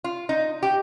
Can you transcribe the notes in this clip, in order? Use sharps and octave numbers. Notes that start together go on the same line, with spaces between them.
F4
D#4
G4